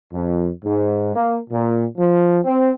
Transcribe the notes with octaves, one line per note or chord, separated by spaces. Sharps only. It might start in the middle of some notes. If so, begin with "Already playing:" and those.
F2
G#2
A#3
A#2
F3
C4